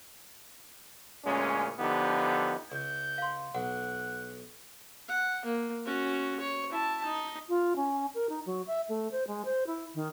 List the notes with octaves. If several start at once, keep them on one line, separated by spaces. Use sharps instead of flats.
D2 A#2 G#3 C#4
D3 F3 B3 D#4 G4
C#2 G6
F5 C6
B1 F#5 F#6
F#5
A#3
C#4 F#4
C#5
E4 A5
D#4
F4
C#4
A#4
D#4
F#3
E5
A3
C5
G#3
C5
E4
D#3